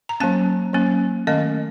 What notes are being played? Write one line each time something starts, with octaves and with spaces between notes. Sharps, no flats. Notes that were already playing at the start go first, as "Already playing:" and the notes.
A#5
F#3 A#3 C#4 A5
F#3 A#3 C#4
D#3 A3 C#4 D#5